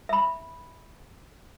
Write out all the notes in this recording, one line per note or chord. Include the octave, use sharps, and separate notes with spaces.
E5 B5